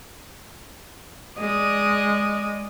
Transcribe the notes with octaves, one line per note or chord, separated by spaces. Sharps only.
G#3 D5 D#5